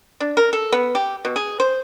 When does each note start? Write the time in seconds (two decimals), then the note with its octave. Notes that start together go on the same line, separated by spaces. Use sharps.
0.20 D4
0.37 A#4
0.53 A4
0.72 B3
0.95 G4
1.25 B2
1.36 G#4
1.60 C5